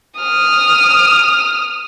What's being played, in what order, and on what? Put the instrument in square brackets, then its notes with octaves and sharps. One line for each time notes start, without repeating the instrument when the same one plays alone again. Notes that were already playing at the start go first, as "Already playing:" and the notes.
[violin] D#6 F6